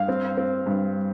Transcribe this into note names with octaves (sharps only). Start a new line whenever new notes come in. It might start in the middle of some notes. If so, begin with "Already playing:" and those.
Already playing: G2 F5
C4
C4
G2